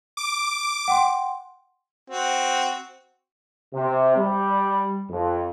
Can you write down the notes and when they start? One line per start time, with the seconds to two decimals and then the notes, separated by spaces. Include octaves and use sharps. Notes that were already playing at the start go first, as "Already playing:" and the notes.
0.17 D6
0.88 F#5 G5 C6
2.10 C4 F#4
3.73 C3
4.16 G3
5.10 F2